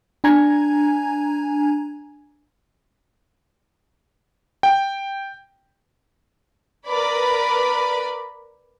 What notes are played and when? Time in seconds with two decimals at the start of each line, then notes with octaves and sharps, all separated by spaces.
0.24 D4 G#5 A#5 G#6
4.63 G5
6.87 A#4 B4 D5 B5